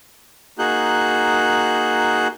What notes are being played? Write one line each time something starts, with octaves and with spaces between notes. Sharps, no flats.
A#3 D#4 F#4 G#4 F#6 G6